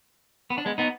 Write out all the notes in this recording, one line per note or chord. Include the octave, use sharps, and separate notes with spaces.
B3
D4
G#3 B3
B3 D#4